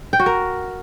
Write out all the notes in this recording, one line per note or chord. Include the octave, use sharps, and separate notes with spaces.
G5
F#4
A#4